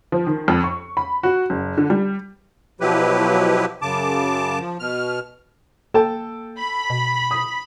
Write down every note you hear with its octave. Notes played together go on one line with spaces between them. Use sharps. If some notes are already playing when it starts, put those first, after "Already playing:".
F3
D#3
F2
C#6
B5
F#4
F#1
D3
G3
B2 F3 F#3 E4 G4 B4
F#2 C#3 A5 D6
F3
B2 F6
A#3 A4 G5 A5
B5
B2
D#6